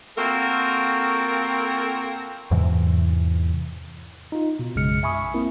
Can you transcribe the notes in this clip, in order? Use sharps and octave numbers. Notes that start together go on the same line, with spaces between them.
A#3 C4 F4 F#4 A4 A#4
E2 G#2 C3 E3
D#4 F4
B2
A#1 F#2 C#3 G#3 F6 C#7
E5 G#5 B5 C#6 D#6
A#3 C4 E4 A#4